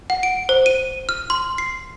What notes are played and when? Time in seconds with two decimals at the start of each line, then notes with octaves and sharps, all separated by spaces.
0.10 F#5
0.23 D7
0.49 C5
0.66 D#7
1.09 F6
1.30 C6
1.58 C7